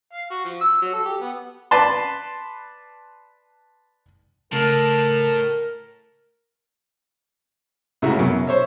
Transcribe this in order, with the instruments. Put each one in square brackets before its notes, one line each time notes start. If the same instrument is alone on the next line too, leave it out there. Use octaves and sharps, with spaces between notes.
[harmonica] F5
F#4
F3
E6
F#3
A4
G4
B3
[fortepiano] B4 D5 A5 C6
[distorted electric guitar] A2 [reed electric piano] C#3 A3 [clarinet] A#4 [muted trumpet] A5
[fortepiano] C#2 A2 C#3 E4 F#4 A#5
F#2 B2
C5 C#5 E5